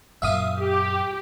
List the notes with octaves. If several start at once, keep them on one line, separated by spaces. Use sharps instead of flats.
F#2 A#2 E5 F5 D#6
G4